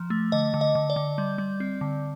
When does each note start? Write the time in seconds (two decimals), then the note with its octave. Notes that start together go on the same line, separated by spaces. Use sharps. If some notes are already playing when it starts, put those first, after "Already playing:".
Already playing: F3
0.10 A3
0.32 D3 D#5
0.54 D3
0.61 D#5
0.75 D3
0.90 D5
0.96 D3
1.18 G3
1.38 G3
1.60 C4
1.81 D3